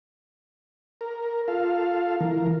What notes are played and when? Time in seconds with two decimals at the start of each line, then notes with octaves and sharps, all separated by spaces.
1.01 A#4
1.48 F4 A4 F5
2.20 E3 A#4